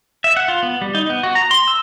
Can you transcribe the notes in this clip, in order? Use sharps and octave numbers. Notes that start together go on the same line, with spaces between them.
E5
F#5
F4
B3
G3
D#4
B3
F#4
A#5
C6
E6